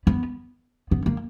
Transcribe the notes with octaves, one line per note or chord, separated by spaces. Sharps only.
B3
B3
A#3